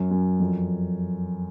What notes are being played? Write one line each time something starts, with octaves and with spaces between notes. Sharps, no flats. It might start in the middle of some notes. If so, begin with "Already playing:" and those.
Already playing: F#2
F#2
F2